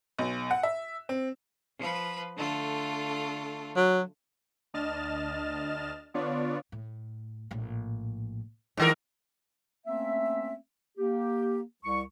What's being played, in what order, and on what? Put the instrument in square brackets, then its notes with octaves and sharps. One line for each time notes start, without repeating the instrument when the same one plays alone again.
[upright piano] B1
F#5
E5
C4
[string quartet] F3 B4
D3 A3 F4
[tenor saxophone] F#3
[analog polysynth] D2 D4 D#5 F6 A6 E7
D3 B3 D4 F4 C#5 D5
[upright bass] A2
A#1 A2
[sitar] G#2 D#3 A#4 [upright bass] F3
[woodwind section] A3 A#3 C4 C#4 E5
A#3 G4
C2 C#6